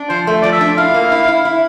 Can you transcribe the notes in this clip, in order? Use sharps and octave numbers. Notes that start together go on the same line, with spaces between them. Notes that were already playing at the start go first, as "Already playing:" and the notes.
Already playing: D4
F3 C5
A3
F3 D5
E5
D4
E4 F5
A#3
E4
E4
E4